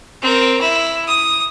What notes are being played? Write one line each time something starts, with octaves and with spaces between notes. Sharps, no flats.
C4 A#4
E4
D#6